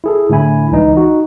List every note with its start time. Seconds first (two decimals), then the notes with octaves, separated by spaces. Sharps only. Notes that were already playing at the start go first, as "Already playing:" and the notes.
0.04 E4 G#4 A4
0.30 A2 D3 A3 E4 G#5 B5
0.72 C#2 E3 D#4 D#5
0.95 D#4 F#4